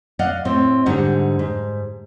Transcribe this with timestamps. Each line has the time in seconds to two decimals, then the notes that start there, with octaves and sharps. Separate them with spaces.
0.19 D5 D#5 F5 F#5
0.45 A2 C4
0.86 G#2 D3 G3 D#4 F#5
1.39 G#2